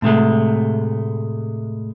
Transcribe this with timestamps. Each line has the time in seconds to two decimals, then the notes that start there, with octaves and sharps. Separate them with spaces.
0.02 A2 C3 G#3 A3